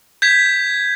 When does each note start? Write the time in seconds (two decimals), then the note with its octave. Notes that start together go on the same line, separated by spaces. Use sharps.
0.22 G6 G#6 B6